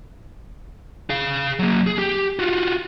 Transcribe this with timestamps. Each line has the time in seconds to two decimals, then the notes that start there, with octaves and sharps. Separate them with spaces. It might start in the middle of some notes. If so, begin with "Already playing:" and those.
1.10 G#4 F5
1.59 F#3 A#3
1.87 G#4
1.98 G4
2.39 F4 F#4